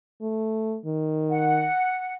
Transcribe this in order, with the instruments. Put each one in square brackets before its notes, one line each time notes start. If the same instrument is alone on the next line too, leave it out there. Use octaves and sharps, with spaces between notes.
[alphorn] A3
D#3
[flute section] F#5